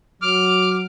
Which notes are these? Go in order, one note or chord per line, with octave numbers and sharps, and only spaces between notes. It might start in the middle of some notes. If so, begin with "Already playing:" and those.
F#3 D6 F6